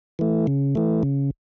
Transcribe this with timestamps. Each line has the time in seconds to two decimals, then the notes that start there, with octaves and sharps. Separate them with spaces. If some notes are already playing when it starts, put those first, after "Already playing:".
0.19 E3 A3
0.47 C#3
0.75 E3 A3
1.03 C#3